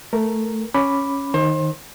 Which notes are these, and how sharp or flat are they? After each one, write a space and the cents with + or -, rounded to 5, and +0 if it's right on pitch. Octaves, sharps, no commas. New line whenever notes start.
A3 +0 A#4 +0
C#4 +0 B5 +0 D6 +0
D#3 +0 C5 +35